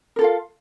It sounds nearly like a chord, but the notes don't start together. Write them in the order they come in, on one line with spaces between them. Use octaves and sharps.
A#4 A4 F4 F5